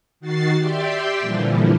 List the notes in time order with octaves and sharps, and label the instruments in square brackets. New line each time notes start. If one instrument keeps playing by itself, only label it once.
[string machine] D#3 F#4 A6 C7
G4 D5 E5 G5 C6
A#2 D3 E3 F3 G3